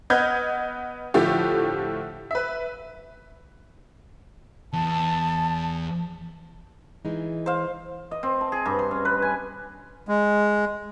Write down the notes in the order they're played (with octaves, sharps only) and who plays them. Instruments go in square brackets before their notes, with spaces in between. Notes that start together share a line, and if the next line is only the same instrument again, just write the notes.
[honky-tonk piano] B3 B4 D#5 F6 G6 G#6
A2 D3 F3 A3 G4
B4 E5
[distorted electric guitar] E2 [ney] A5
[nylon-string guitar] E3 G#3 D#4
[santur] C5 F5
[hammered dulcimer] D#5
C4
A5
G#4
G2
C6
C#4
B4
G#5
[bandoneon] G#3